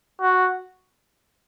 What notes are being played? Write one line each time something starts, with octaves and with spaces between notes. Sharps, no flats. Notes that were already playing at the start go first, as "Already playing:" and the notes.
F#4